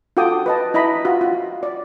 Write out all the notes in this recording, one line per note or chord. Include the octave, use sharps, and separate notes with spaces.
F4 F#4 A4 G5 D6 D#6
B4 D#5 A5
E4 D#5 A#5 B5
F4 F#4
F4
D5